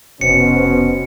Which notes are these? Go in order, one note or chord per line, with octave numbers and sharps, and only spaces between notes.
F1 B2 B3 C#4 C5 C#7